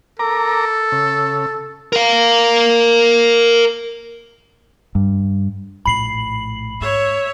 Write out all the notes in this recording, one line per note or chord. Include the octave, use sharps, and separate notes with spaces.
A4 A#4 A#5 D6
C#3
A#4 F5
G2
A#1 A2 B5 C7 F#7
G#2 C#5 E5